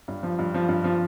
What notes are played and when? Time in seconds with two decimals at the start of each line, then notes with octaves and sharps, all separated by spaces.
0.08 G2
0.23 F3
0.39 G2
0.54 F3
0.69 G2
0.84 F3